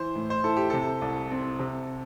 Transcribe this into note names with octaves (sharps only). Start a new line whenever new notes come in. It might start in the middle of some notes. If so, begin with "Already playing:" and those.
Already playing: E3 C5
A2
C5
E4 A4
G4
C3 A4
C2
C4
C3